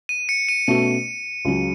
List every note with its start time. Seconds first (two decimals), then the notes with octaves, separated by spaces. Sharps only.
0.09 D#7
0.29 C#7
0.49 D#7
0.67 B2 A3 C#4 F#4 D#7
1.45 C#2 C#3 F#3